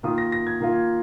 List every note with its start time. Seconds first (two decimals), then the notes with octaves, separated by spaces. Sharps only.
0.03 D#3 A#3 F4 D#6
0.18 A#6
0.32 A#6
0.47 G#6
0.60 D#3 A#3 F4